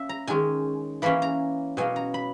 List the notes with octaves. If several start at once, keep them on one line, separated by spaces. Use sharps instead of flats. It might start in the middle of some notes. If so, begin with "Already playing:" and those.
Already playing: A#3 C#4 E5
A#5
D#3 G#3 C#4 G#5
E3 A#3 C#4 B5
A#5
B2 F#3 A#3 C#4 G#5
A#5
B5